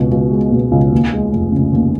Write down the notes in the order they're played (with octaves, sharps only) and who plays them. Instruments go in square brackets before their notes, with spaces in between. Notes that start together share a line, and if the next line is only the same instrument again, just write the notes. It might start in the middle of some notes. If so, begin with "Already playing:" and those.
Already playing: [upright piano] C#2 B2
C#2
G#3
B2
C#2
D#2
G#3
F1
C#3
D#2